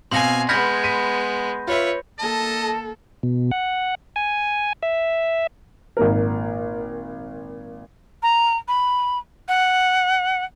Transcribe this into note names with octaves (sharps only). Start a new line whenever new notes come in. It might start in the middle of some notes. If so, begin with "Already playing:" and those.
B2 C4 F5 G#5 C6 A#6
G#3 B3 B5 F6 G6 G#6 A#6 B6
B6 D#7
F4 B4 C#5 E5
A#3 A4 D#5 A5
B2
F#5
G#5
E5
G#1 A#2 A#4
A#5
B5
F#5